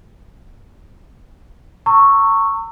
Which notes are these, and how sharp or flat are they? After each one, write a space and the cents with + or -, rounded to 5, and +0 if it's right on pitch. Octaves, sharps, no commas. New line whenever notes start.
A#5 -40 C#6 +0 E6 +0